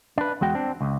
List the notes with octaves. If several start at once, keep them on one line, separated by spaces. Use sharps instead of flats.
D4 B4
E2 G#3 F#4 G5
C4 D4
C#2